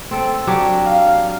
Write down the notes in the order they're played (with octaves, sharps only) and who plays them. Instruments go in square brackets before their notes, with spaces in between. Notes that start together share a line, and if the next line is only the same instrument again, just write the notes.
[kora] C4 A4
F#3 D4 G4
[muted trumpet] F5